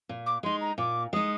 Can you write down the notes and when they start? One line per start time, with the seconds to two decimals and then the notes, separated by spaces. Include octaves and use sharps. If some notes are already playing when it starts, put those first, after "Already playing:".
0.09 A#2
0.26 D6
0.43 G#3 D#4 C6
0.61 A#5
0.78 A#2 D6
1.13 G#3 D#4 D#6